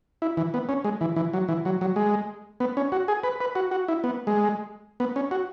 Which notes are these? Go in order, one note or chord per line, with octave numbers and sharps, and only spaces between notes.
E4
E3
B3
C#4
G#3
E3
E3
F#3
E3
F#3
F#3
G#3
B3
C#4
F#4
G#4
B4
B4
F#4
F#4
E4
B3
G#3
B3
C#4
F#4